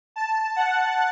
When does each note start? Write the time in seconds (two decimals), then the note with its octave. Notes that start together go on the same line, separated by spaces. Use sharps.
0.16 A5
0.56 F#5